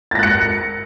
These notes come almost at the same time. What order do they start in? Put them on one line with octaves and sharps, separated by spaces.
A6 A#6 F#6 C#7